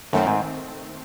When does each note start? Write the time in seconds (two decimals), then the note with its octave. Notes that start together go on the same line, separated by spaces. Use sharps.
0.13 F#2 D#3 A3 C4
0.27 G#2